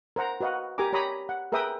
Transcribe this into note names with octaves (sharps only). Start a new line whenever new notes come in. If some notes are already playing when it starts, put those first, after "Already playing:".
A#4 C5 F#5 A#5
F#4 B4 D#5 F5 F#5
G4 A#4 G#5 A#5 D6
G4 C#5 A#5 B5 D#6
F#5
G#4 A#4 B4 E5 G5 D#6